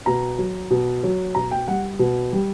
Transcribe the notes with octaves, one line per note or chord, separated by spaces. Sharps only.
B2 A#5
F#3
B2
F#3
B2 A#5
G5
G3 F#5
B2
G3